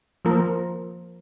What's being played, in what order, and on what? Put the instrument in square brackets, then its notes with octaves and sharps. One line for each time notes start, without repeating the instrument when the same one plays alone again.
[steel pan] F3 A#3 F4 A#4